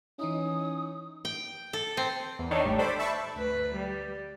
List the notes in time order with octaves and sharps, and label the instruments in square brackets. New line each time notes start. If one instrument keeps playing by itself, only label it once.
[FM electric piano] E3 D#4 E4 [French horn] C#4 [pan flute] D#6
[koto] G5
A4
C4
[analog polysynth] E2
D#3 D4 D#4 A4 C#5
A1 A2 G3
D4 A4 C5 B5 D6
E5 A5 B5 C#6
[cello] D2 B4
G3